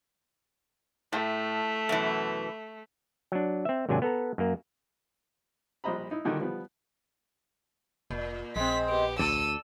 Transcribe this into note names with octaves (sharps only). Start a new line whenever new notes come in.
A2 A3
F#2 B2 E3
F#3 D4
C4 E5
G#1 C3 F#3 D4 G#5
B3 A4 A#5
F#2 A#3
A#1 G3 C5 D#5 A#5 B5
D#4 E4
A#2 D3 D#3 G3 D#4 F#4
F3 G3 B3
F1 A#2
A#1 G#3 C4 B6
B3 G4
D2 A4 D5 E6 D#7